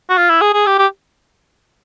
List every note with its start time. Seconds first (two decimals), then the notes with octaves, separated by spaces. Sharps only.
0.10 F#4
0.17 F4
0.29 E4
0.41 G#4
0.53 G#4
0.66 G4
0.78 G4